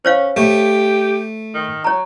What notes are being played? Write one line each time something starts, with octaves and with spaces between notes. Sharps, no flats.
C#4 C5 C#5 F5
A3 G4
D#3
F#3 C#5 A#5